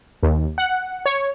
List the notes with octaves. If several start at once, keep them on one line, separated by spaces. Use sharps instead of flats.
D#2
F#5
C#5